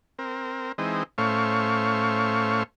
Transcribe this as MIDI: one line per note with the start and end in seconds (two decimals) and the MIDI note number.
0.19 0.72 60
0.19 0.72 70
0.78 1.03 52
0.78 1.03 56
0.78 1.03 60
0.78 1.03 63
1.18 2.63 45
1.18 2.63 57
1.18 2.63 61
1.18 2.63 72
1.18 2.63 77
1.18 2.63 85